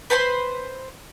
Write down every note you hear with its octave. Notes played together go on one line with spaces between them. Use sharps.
B4 C5 B5 C6